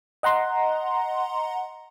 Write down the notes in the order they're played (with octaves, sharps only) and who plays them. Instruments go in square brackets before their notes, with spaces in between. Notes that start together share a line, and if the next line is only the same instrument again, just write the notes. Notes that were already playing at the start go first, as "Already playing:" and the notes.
[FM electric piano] D#5 F#5 A#5 C6